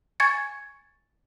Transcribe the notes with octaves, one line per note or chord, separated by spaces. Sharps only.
G#5 C#6 G#6 A6 C#7